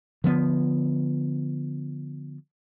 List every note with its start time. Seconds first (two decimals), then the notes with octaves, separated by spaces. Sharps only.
0.24 D3 F3 B3